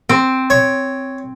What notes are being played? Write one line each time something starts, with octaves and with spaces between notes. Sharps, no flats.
C4
C#5